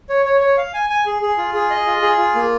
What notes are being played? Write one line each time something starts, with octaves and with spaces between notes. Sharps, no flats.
C#5
C#5
C#5
F5
G#5
G#5
G#4
G#4
F4
G#4
D#5
F4
G#4
F4
A#3